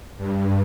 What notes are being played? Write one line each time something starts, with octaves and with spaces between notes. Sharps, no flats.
G2